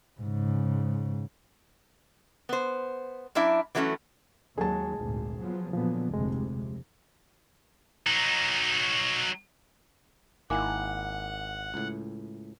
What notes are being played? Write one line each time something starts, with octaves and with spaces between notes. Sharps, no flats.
G#2 C#3
B3 C5
F#2 D4 E4 E5
E3 F#3 A3 B3 C#4
D#2 F#3 G#3 G#4 A5
G#1 D2 A#2
F3 F#3 B3
A#2 D3 F3 F#3 B3
F1 D2 C3 G#3
F#3 D#4
G#1 D#3 A#3 E4 F#5 G#5 D6
C#2 A2